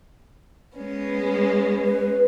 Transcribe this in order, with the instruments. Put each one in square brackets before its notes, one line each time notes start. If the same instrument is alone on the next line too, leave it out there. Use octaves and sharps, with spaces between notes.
[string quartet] G#3 B3 C#4
[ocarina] B4